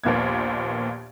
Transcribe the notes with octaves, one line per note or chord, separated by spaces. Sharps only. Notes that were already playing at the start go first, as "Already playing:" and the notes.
A#1 D#2 A#2 A#3 B3 G#6